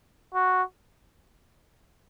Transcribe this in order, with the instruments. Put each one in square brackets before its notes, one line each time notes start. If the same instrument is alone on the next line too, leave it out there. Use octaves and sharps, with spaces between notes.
[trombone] F#4